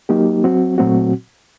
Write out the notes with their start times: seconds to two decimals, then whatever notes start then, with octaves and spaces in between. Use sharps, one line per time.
0.09 F#3 A#3 D#4 G4
0.44 F#3 C4 F#4
0.78 A#2 F#3 A3 C4 F#4